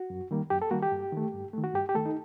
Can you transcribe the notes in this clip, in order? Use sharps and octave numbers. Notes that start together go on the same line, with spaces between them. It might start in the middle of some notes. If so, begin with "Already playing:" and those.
Already playing: F#4
F#2
D#3 G3 A#3
F#2 G4
A4
D#3 G3 A#3 F#4
G4
G2
D#3 A3
G2
D#3 A3
F#4
G2 G4
G4
D#3 A3 A4
D#4